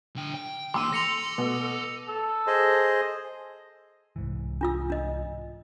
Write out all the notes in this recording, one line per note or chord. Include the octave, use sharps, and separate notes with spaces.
D3 G5
G5
E3 A#3 C6 D6 E6 D#7
A4 A#6 C#7 F7
B2
A4
G#4 C5 D#5
C2 G#2 E3
D4 F4 E6
D4 D#5